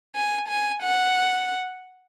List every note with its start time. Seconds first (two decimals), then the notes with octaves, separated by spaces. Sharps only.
0.16 G#5
0.48 G#5
0.82 F#5